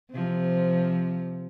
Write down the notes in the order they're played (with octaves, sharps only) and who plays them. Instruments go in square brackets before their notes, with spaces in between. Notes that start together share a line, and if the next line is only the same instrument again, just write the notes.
[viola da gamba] C3 F3